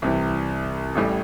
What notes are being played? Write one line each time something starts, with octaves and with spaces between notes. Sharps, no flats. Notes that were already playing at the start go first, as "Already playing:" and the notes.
C2 C3 E3
A1 A2 G3